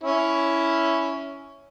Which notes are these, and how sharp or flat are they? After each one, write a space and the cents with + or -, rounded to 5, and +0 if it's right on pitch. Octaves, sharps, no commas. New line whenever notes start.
C#4 +10 E4 +0